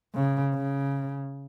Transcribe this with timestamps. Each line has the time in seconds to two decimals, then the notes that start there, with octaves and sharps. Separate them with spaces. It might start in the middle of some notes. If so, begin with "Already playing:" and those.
0.15 C#3
0.54 C#3